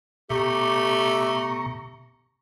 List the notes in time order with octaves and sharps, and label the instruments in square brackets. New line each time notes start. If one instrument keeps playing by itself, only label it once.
[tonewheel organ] B2 A#5 C#6 [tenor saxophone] A3 [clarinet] G4